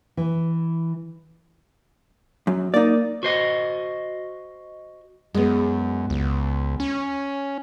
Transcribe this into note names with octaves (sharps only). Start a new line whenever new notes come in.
E3
F#2
A#3 D#4 D5
F#4 C5 D#5
F#2 G#3 B3
C#2
C#4